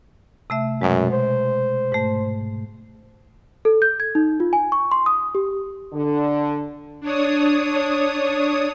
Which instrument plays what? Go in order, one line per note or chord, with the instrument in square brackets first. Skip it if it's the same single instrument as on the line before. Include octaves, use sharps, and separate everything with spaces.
[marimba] C3 A3 E5
[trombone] F#2 [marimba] B2 G#3
[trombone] C5
[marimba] G#2 A3
[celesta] A4
G6
G#6
D#4
F4
G#5
C#6
C6
D#6
G4
[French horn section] D3
[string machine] D4 C#5 D#6